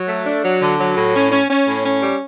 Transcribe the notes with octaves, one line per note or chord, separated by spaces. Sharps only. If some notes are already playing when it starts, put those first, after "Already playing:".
Already playing: F#3
A3
D4
F#3
D3
F#3
A2
C#4
C#4
C#4
A2
C#4
G3